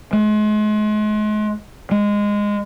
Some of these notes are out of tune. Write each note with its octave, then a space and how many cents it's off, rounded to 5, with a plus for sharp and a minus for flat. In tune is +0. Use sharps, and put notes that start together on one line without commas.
G#3 +35
G#3 -15